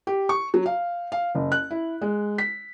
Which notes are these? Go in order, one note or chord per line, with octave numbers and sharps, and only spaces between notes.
G4
C#6
F#3
F5
F5
F#1
F#6
E4
G#3
B6